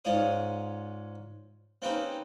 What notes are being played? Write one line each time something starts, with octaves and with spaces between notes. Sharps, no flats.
G#2 C#4 F4 C#5 D5 D#6
A#3 C4 C#4 D#4 G4 B4